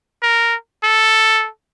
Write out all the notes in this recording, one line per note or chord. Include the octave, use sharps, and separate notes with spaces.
A#4
A4